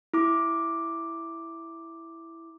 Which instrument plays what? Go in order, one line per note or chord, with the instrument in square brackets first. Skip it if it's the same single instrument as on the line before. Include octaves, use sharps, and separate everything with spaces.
[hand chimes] E4 D6